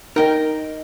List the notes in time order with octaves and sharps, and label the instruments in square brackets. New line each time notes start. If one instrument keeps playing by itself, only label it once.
[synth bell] D#4 D#5 [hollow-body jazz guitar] A#4 G5